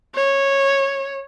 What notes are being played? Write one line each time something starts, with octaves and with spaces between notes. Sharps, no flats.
C#5